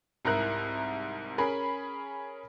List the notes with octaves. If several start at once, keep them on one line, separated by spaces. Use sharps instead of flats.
C2 G#2 E4 A#4 A#5 F#6
C#4 G#4 A#4 B5